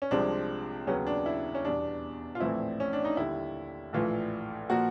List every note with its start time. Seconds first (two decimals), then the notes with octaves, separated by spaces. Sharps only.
0.02 C#4
0.11 C2 C3 F3 G#3 C4 D4
0.87 D#2 C#3 F#3 B3 C#4
1.07 D4
1.26 E4
1.55 C#4
1.64 E2 B2 G3 D4
2.35 F4
2.40 A#1 A2 E3 A3 C4 E4
2.80 C#4
2.93 D4
3.05 D#4
3.17 D#2 D3 G3 E4
3.93 A#1 A2 E3 A3 F4
4.70 A#2 F3 A#3 F#4